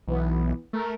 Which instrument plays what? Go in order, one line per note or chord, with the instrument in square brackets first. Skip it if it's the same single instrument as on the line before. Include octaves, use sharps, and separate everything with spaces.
[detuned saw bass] B1 [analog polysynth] E3 B3
[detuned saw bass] A3 [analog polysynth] A#4